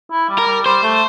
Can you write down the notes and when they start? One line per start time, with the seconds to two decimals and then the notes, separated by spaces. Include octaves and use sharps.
0.12 E4
0.29 G3
0.39 A#4
0.47 G3
0.65 G3 C5
0.83 A3